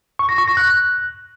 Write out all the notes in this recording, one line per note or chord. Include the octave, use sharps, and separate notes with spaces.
C#6
A#6
C#6
A#6
F#6